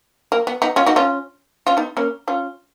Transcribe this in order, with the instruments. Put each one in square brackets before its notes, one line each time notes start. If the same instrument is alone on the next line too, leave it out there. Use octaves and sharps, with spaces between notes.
[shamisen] A#3
B3
B3 D#4
C#4 F4
D#4 F#4
C#4 F4
C#4 F4
B3 D#4
A#3 C#4
C#4 F4